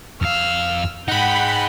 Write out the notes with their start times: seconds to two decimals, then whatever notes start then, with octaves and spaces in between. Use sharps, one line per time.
0.22 F2 F5 E6 F6
1.08 D#4 G#4 F#5 G5 B5 G6